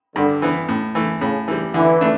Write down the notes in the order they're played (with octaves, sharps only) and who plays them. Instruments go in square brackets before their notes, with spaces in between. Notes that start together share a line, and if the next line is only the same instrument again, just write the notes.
[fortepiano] G2 [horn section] D3
[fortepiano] E3 B3
A2
E3 A3
[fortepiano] A2 [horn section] C#3
[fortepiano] E3 G3
[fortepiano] D3 [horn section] E3
[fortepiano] A3 D4